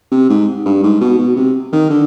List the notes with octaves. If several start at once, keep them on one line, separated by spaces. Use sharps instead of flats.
C3
G#2
G2
G#2
B2
B2
C3
D#3
D3